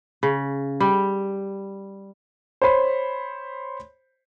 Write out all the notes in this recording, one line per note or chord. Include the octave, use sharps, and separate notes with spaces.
C#3
G3
C5 C#5 B5